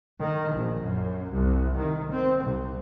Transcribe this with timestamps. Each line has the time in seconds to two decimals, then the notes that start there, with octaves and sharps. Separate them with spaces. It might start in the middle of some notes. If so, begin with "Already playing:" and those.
0.21 D#3
0.55 A#1
0.83 F#2
1.31 C2
1.78 D#3
2.11 C4
2.43 C2